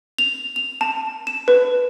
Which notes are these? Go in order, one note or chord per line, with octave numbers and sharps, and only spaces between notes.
F7
F7
A5
E7
B4